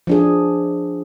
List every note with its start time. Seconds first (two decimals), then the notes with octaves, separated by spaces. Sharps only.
0.07 F3 D4 G#4